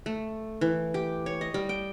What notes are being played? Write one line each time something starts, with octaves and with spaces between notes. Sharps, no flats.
A3
E3
G4
C#5
D#5
G3
G5